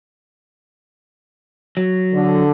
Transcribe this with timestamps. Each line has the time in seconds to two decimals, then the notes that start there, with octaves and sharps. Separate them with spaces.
1.77 F#3
2.13 D3